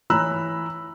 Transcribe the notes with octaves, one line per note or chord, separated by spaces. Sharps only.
E3 C#5 A#5 B5 E6 F#6